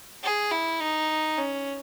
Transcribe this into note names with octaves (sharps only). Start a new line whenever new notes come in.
G#4
E4
D#4
C#4